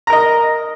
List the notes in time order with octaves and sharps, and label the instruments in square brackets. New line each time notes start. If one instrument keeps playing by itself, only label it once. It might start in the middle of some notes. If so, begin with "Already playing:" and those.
[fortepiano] A#5
A#4
D#5